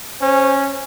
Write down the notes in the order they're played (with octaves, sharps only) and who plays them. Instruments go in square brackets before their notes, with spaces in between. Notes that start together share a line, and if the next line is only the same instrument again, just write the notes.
[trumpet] C#4 [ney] C5